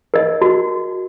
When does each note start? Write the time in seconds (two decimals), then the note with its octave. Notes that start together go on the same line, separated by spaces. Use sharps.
0.14 A#4 D#5
0.41 F#4